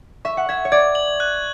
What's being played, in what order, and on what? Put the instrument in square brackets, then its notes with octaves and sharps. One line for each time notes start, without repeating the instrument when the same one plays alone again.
[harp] E5 [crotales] C#6
[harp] F#5
[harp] E5 [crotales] G#6
[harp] C#5
[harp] D5 [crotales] G#6
[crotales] F#7
F#6